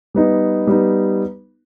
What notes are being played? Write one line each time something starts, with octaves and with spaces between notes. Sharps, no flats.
G3 B3 D#4
G3 B3 D#4